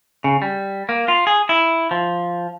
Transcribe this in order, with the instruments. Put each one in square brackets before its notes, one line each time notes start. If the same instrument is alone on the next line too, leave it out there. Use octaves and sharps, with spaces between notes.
[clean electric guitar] C#3
G3
A#3
F4
G#4
E4
F3